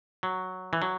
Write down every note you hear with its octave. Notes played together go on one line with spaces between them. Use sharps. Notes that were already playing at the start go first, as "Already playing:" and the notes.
F#3
E3
F#3